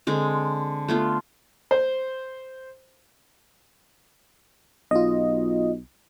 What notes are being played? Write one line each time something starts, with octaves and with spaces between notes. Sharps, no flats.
D3 G#3 C4
A3 B3 F4
C5
B1 F4 D#5